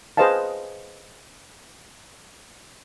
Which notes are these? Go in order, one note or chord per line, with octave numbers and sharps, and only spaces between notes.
G#4 B4 C5 D#5 F5 A5